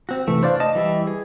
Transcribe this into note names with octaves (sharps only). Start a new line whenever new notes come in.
C4 F#4
C3 E3 A3
D4 C5 D5 F5
D#5 A5
E3 G3 E4
G#4